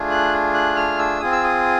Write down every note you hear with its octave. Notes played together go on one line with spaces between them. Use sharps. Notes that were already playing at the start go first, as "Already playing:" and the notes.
Already playing: A3 D4 F4 G#4
F#6
F#6
F6
E6
C4 F4 G#4 D#6
E6
D#6